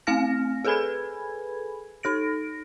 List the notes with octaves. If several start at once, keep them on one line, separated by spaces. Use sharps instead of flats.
A3 C4 F5 G#5 F6 A#6
G#4 A4 B4 G#5 B5 G#6
D#4 A4 A#6 D7